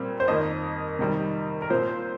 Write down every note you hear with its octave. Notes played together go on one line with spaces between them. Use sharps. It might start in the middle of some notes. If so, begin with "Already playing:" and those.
Already playing: A#2 G3 C4
C5
F2 D#3 A#3 D#5
C3 D#3 G3
A#4
A#2 F3 C4 C5